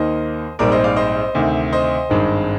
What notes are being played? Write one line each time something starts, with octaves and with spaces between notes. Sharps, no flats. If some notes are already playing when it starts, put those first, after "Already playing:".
Already playing: D#2 D#3 A#3 C5 D#5
A#1 G#2 G3 C4 A#4 D5
C5 D#5
D5 F5
C5 D#5
D2 C3 D#3
C5 D#5
G#1 G2 D#3 G#3 C4